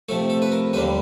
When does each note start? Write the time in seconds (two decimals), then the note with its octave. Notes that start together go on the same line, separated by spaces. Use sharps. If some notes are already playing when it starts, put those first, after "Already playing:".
0.09 C3 F3 A3 A4
0.30 A4
0.42 B4
0.52 A#4
0.73 D#2 D3 G3 A#3 B4